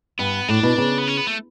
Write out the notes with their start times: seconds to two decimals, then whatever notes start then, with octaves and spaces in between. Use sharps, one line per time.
0.19 G2 B3
0.48 A2 D4
0.63 B2
0.78 C#3
0.98 B3
1.08 C#4
1.17 B3
1.27 A3